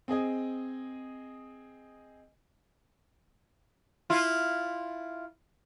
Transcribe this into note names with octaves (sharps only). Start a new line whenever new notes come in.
C4 G#4 D#5 G#5
E4 F4